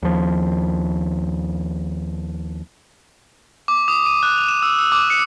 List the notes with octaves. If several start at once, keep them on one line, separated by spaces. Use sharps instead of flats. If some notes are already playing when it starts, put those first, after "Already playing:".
D#2 F3
D6
D#6
D#7
F#6
F7
E7
E6
E6
D6
C#7